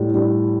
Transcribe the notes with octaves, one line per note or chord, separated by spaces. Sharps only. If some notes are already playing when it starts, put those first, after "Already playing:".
Already playing: A2 G3
G3